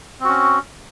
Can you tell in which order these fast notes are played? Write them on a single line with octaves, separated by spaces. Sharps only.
C4 F#4 C#4